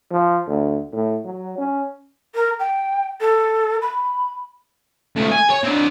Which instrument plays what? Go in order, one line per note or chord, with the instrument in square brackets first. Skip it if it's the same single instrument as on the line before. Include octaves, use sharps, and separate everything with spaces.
[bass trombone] F3
D2
A2
F#3
C#4
[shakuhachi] A#4
G5
A4
B5
[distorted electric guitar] C#2 A3
G#5
C#5
C4 D4